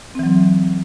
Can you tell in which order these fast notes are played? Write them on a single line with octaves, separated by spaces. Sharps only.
C4 E3 F#3